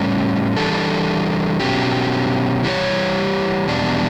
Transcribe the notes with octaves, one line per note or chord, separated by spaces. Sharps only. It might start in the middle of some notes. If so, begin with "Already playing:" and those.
Already playing: A2 G3 C#4 G4
E3 G3 D4 A4
B2 F#3 C#4 G4
E3 G3 D4 G4 C#5
E2 B2 G3 D4